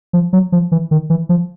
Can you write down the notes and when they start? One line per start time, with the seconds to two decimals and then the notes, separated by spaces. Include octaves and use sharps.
0.13 F3
0.33 F#3
0.52 F3
0.72 E3
0.91 D#3
1.10 E3
1.29 F3